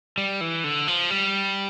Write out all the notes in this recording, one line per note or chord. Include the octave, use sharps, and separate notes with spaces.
G3
E3
D3
F3
G3